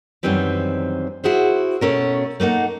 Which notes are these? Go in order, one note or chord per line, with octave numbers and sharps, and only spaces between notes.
F#2 D#3 E3 G3 C4 B4
E4 F#4 G#4 C5
B2 A3 C#4 A#4
A3 A#3 D#4 F#5